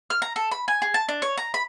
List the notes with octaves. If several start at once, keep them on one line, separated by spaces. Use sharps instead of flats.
F6
A#5
A4
B5
G#5
G#4
A5
D4
C#5
A#5
B5